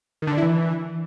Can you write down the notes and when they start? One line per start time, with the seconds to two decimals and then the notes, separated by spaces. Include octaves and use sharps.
0.22 D#3
0.27 D3
0.32 D4
0.38 E4
0.43 E3